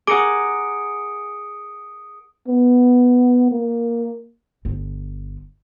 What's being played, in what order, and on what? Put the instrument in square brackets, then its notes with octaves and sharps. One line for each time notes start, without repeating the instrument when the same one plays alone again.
[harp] G#4 A#4 F#5 [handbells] D6 [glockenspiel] D#6 C#7 D7
[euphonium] B3
A#3
[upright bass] G1 F3